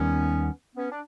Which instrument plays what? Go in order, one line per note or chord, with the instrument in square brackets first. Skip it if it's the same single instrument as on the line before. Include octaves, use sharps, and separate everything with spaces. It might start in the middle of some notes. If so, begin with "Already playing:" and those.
Already playing: [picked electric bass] D#2 D#3 G3 [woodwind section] B3 C#4
[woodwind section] B3 C#4
D4